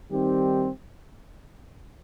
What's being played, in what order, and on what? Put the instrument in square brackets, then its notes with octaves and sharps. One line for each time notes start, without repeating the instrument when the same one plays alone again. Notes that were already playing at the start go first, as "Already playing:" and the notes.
[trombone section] D#3 G3 C4 D#4 G4